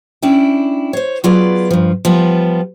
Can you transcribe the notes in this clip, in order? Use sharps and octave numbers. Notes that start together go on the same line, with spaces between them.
C#4 D4 E4 G5
C5 C#5
F#3 B3 F4 G#4 B4 D5
G2 F3
F3 G3 B3 F4